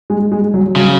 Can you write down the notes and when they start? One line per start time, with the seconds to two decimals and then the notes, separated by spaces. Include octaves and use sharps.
0.10 G#3
0.32 G#3
0.54 F#3
0.76 C#3 F#3